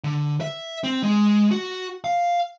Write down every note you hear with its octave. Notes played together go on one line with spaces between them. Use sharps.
D3
E5
C4
G#3
F#4
F5